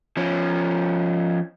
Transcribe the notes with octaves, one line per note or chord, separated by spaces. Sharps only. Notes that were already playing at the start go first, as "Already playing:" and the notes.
F3 C#4